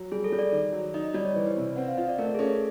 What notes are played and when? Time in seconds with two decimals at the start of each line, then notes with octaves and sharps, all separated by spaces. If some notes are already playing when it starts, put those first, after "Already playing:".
Already playing: F#3
0.12 G3 G#4
0.24 A4
0.32 G3
0.39 D5
0.52 D#3
0.73 F#3
0.94 D#4 D#5
1.04 D#5
1.14 G3 D5
1.25 C#5
1.35 E3 C5
1.46 B4
1.57 C3
1.76 C4 F#5
1.88 F5
1.97 F4 D#5
2.08 D5
2.18 A3 A#4
2.34 G#4
2.39 C#4 A4